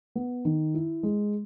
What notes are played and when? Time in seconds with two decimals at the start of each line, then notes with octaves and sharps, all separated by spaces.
0.15 B3
0.45 D#3
0.74 E4
1.03 G#3